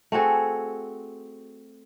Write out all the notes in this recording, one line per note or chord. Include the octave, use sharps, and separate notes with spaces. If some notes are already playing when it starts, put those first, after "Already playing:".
A3 C4 F#4 G#4